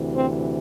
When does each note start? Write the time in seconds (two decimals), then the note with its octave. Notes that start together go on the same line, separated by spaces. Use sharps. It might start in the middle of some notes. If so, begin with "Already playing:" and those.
Already playing: D2 C3 E3
0.14 C4